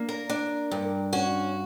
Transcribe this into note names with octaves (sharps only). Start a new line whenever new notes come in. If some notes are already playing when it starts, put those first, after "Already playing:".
Already playing: A#3 D4
A#4
D4
G2
C#4 F#4